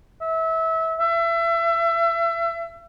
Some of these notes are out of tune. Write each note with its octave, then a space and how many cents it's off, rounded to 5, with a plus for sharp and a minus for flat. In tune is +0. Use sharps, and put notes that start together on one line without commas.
E5 -25
E5 +30